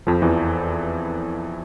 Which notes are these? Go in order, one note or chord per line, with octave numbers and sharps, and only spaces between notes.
F2 F3
E2 E3